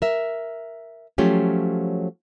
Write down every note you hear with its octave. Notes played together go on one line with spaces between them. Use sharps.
A#4 E5
F3 F#3 A3 C#4 F4 G4